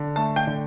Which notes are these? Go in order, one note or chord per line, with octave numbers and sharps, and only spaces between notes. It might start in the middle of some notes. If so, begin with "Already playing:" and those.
Already playing: D3
A3 A5
G5
D3